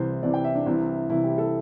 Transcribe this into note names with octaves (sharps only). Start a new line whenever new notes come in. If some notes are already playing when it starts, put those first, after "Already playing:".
Already playing: C2 C3 E3 C5
C2 C3 E3 D5
G5
E5
D4
C2 C3 E3 E4
C2 C3 E3 E4
G4
A4